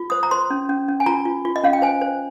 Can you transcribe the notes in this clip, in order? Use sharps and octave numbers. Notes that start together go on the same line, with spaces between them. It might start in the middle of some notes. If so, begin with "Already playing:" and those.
Already playing: F4
C5 D#6
A#5
C5 C6
C#4
C#4
C#4
G#5
F4 A#5
F4
F4
D#5
C#4 F5
G5
C5 G#5
C5